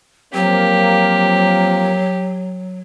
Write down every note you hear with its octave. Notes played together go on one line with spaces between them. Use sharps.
F3 F#3 A#3 C4 G4